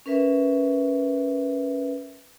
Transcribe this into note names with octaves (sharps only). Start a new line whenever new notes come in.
C#4 A#4 B4 E5